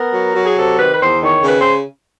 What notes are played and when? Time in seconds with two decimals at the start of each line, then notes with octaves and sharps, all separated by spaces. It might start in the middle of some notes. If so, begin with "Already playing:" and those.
Already playing: B3 A#4
0.13 F#3
0.35 F#3
0.45 G#4
0.57 C3 A4
0.78 D#3 B4
0.93 B4
1.00 E2 C5
1.21 D#3 C#5
1.43 C#3 B4
1.59 C5